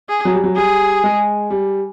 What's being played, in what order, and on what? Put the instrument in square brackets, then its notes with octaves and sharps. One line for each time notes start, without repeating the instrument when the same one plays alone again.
[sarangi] G#4
[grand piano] F#3
G3
F#3
[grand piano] G3 [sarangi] G#4
[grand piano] G#3
G3